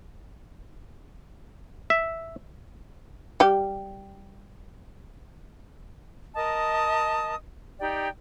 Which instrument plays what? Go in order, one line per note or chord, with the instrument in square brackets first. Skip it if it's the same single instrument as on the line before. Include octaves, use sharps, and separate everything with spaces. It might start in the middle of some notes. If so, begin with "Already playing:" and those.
[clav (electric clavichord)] E5
[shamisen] G3 G4
[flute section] A#4 D#5 A5 D#6
D#4 G4 D5 G5